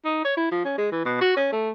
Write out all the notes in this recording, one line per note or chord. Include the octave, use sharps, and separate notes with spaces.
D#4
C#5
E4
F3
C#4
G#3
E3
B2
F#4
C#4
A3